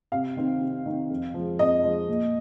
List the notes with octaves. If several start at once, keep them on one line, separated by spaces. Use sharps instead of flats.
C3 F5
D#3 C4
C3
D#3 C4
F2
F3 G#3
F2 D#5
F3 G#3
A#2